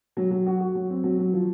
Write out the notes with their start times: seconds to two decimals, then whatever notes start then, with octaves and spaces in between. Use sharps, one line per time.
0.17 F#3
0.31 F#3
0.46 F#4
0.60 F#4
0.75 F#3
0.90 C4
1.04 F#3
1.19 F#3
1.33 F3